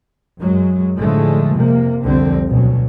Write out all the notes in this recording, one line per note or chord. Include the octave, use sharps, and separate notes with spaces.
F#2 F#3 G#3
A2 D3 F3 G#3 A3
F2 C3 A#3
C2 F2 D3 C4
D2 B2 F#3